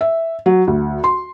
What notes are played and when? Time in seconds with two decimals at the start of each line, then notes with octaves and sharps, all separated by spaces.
0.01 E5
0.46 F#3
0.67 D2
1.04 C6